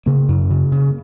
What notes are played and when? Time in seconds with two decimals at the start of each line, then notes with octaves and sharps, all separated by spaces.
0.06 C#3 A#3
0.28 F#2
0.50 C#3
0.72 C#3